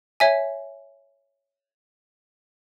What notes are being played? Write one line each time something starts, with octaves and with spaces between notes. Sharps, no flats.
C#5 E5 G#5